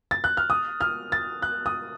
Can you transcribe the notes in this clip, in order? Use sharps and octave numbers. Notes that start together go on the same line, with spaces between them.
A6
F#6
F6
D#6
F6
A6
F#6
D#6